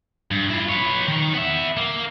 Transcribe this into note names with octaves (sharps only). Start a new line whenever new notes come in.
G2
E4 F4
B4 C#5
D#3
B3 E5
A#3